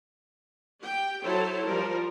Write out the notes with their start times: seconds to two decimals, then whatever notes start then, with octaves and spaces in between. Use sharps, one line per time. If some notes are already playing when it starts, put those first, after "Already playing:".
0.81 G4 G5
1.21 F#3 E4 A4 C5 C#5 A5
1.65 F3 G3 A#4